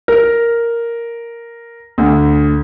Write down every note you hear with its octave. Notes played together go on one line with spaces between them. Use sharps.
A#4
D2